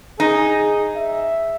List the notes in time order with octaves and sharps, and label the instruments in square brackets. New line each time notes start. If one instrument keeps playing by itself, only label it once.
[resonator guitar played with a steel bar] D#4 [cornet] G#4
[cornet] E5